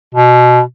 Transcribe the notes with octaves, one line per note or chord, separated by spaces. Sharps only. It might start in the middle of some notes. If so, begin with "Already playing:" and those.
B2